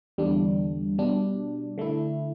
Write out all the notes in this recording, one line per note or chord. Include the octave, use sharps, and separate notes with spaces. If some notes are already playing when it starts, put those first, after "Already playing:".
E2 D3 G3 D4
B2 G3 D4
D3 A3 E4